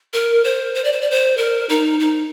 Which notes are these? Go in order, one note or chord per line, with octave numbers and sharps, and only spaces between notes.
A#4
C5
C5
D5
C5
D5
C5
A#4
D#4
D#4